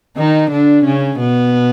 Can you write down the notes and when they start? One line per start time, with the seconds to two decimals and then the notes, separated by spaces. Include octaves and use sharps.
0.17 D#3 D#4
0.51 D3 D4
0.85 C#3 C#4
1.19 B2 B3